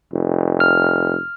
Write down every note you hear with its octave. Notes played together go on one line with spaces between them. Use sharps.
F1
F6